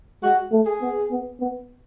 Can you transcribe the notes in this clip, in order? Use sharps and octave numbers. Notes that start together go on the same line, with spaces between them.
G#3 F#4
A3
G#4
B3
B3
B3